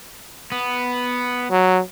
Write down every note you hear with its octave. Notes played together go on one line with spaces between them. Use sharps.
B3
F#3